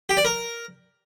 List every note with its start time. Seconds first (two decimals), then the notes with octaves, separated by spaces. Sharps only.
0.09 G4
0.17 D5
0.25 A#4